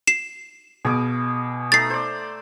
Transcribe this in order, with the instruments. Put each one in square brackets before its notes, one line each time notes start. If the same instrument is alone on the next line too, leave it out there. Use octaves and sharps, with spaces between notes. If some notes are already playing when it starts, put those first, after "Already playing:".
[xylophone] C7 E7
[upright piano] B2 [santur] G#4 F5 D6
[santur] A3 D#4 A#5 [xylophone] A6 C7
[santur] C5 D5